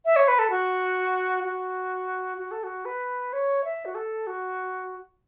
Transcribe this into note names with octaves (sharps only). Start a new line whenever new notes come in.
E5
C#5
B4
A4
F#4
F#4
F#4
A4
F#4
B4
C#5
E5
F#4
A4
F#4